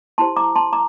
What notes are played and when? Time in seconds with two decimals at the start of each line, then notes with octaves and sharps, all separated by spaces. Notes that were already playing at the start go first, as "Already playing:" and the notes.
0.18 E4 G4 C5 A5 C6
0.36 A#5 D6
0.56 A5 C6
0.73 A#5 D6